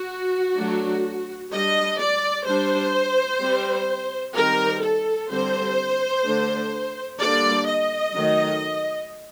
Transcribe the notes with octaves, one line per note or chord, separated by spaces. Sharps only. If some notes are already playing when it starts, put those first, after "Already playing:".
Already playing: F#4
F#3 A3 D4
G3 D4 D#5
D5
G3 D4 C5
G3 C4
D#3 G3 C4 A#4
A4
D3 G3 C4 C5
D3 A3 D4
D3 G3 A#3 D4 D5
D#5
D#3 F#3 A3